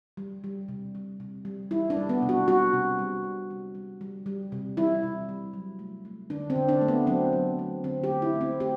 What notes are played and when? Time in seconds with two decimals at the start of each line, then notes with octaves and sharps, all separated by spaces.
0.17 G3
0.44 G3
0.69 C3
0.95 G3
1.20 C3
1.45 G3
1.71 G3 E4
1.90 D4
1.97 G3
2.09 B3
2.22 C3
2.29 F#4
2.48 G3 F#4
2.73 C3
2.99 G3
3.24 G3
3.50 G3
3.75 G3
4.01 G3
4.26 G3
4.52 C3
4.77 G3 E4
5.03 C3
5.29 G3
5.54 F#3
5.79 A3
6.05 A3
6.30 D3 D4
6.50 C4
6.56 D3
6.69 D4
6.81 A3
6.88 B3
7.07 F#3 C4
7.33 F#3
7.59 A3
7.84 D3 C4
8.04 G4
8.09 A3
8.22 E4
8.35 A3
8.41 C4
8.60 A3 G4